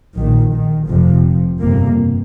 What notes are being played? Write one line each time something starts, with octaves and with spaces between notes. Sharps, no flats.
A#1 A#2 D#3
D#3
F1 F2 C3 F3
G1 F2 C3 A#3